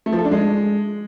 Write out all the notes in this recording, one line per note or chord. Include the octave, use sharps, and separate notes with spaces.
A3
F3
A4
D4
G#3